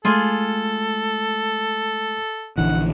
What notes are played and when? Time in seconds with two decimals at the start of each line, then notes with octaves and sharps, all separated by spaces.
0.05 G#3 A3 F4 G#4 A4
2.58 A#1 D3 E3 F#5